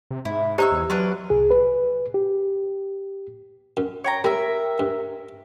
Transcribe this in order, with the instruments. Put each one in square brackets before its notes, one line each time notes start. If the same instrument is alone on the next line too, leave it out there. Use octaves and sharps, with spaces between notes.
[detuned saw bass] C3
[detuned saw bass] G#2 [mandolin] E4
[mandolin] D#4 C#5 E6 [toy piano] G4 C5 A#5
[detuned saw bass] E2
[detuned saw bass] F#3 [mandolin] C#4 D4 B4 [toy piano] C6
[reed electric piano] C2 G#4
B4
G4
[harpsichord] F#2
[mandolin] C#5 G5 A#5
[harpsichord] G3 [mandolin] A#4 E5
[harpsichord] G2